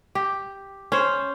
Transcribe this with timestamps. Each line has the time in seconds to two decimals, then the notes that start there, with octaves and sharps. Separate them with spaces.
0.15 G4
0.92 C#4 C5